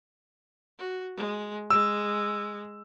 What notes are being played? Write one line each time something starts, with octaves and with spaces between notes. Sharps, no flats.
F#4
G#3
G#3 E6